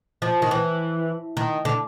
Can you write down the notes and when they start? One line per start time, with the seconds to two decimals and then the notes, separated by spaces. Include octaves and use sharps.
0.22 F3
0.42 D#3
0.51 E3
1.37 D#3
1.65 D3